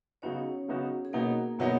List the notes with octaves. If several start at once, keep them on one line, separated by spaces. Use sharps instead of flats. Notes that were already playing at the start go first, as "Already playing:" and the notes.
C#3 F#3 B3 C#4 D#4 F#4 C#5
C#3 F#3 B3 D#4 F#4
G#4
B2 F#3 A#3 B3 D#4 A#4
B2 F#3 B3 D#4